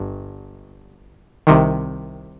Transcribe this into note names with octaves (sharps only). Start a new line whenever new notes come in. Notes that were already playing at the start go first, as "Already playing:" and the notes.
Already playing: G1 G2
C2 C3 D#3